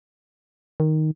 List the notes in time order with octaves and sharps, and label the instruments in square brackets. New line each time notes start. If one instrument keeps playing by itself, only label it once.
[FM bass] D#3